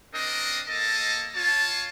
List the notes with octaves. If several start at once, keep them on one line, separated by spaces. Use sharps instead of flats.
C4 D4 A#4 D#5
A#3 A4 D#5 A5
F4 C#5 A5